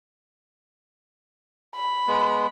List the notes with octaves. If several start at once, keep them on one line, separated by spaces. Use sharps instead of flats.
B5
G#3 B3